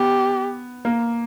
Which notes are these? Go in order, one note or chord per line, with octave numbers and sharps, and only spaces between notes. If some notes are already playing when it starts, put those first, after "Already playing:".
Already playing: B3 G4
A#3